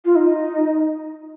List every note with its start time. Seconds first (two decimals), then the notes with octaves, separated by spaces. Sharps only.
0.05 F4
0.16 D#4